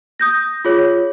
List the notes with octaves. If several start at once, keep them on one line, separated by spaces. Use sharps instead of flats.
D#6 G6 A#6
F4 G#4 C#5